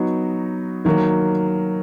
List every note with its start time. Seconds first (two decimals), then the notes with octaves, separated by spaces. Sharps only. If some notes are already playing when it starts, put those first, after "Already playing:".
Already playing: F#3 B3 D#4 F#4
0.85 D#3 F#3 A#3